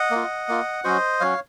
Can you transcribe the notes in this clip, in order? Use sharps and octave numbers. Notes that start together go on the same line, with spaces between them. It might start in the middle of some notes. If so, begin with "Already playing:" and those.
Already playing: D#5 F#5
A#3
F4
A#3 F4
F#3 C#4 F#4 C5 D#5
F#3 C#4 F#4 C#5 F5